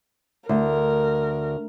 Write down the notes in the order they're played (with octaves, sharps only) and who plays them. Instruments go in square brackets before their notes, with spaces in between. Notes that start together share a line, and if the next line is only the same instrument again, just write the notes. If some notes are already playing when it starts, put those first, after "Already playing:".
[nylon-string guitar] D2 [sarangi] A#4